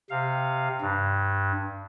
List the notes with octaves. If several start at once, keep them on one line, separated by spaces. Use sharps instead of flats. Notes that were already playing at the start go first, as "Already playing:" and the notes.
C3 F5
G2